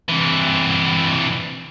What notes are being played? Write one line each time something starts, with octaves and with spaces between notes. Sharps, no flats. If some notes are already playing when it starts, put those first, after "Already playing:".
C3 E3